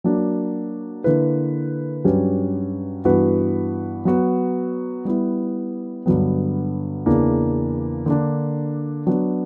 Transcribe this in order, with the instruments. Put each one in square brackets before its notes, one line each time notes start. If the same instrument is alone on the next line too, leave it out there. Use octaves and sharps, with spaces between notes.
[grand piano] F#3 A#3 D4
D3 A#3 E4 B4
G2 F#3 C#4 G4 B4
G2 E3 B3 F#4 B4
F#3 B3 F#4
G3 B3 E4
G2 D3 F#3 B3
E2 C#3 E3 A#3 D4
D3 A#3 D4
F#3 B3 D4 F#4